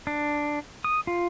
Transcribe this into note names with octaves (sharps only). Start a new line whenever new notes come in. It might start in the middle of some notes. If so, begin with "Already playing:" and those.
D4
D#6
F4